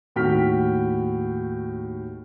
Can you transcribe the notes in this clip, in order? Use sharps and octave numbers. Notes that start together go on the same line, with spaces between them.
D#2 A2 F#4 G5 F6 B6